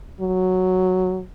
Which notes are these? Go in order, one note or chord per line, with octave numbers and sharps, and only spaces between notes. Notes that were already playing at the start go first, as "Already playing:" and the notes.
F#3